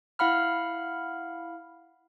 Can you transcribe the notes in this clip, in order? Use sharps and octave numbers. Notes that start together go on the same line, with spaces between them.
E4 F5 F#5 B5 F6